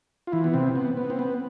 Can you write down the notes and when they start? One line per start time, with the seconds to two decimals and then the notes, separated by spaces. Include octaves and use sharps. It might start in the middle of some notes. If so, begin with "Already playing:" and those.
0.27 F4
0.32 E3 E4
0.44 B3
0.54 C3 C4
0.76 B3
0.97 B3
1.10 C4
1.19 B3